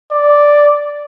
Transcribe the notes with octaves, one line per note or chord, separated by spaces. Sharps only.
D5